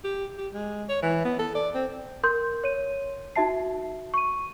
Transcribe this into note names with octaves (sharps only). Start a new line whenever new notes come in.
G4
G4
G#3
C#5
E3
B3
A4
D5
C4
A#4 C6 G6
C#5 D#7
D#4 F#4 E5 A5 C7
C#6 D#7